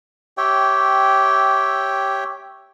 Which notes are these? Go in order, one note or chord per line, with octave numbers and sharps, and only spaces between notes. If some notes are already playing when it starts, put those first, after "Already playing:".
G4 C#5 E5 G5